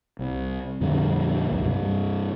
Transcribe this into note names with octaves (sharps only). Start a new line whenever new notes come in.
C2
F2 A#2 D3 G3
C#2 F#2
G2 C3 G3